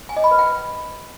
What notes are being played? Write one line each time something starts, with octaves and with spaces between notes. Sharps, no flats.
G#5
D#5
B5
B4
G5